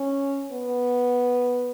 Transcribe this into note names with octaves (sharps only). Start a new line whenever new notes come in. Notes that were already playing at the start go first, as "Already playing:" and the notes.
Already playing: C#4
B3